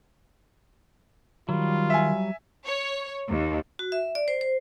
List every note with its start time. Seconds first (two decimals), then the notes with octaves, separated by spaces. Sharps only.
1.49 D#3 F#3 G3 F4
1.90 E5 G#5
2.65 C#5
3.28 D#2
3.79 F#4
3.92 E5
4.15 D5
4.28 C5
4.41 C5